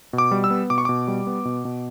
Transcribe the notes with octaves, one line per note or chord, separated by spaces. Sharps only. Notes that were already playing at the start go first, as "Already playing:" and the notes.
B2
D6
G3
E6
B3
B2 D6
C#6
B2 D6
G3
B3
B2
B2